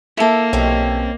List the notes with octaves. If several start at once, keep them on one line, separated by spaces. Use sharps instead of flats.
A#3 E4 A4
B1 C3 C4 C#4 D#5